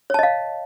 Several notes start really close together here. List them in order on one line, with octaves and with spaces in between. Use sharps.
C#5 A5 D#5 F5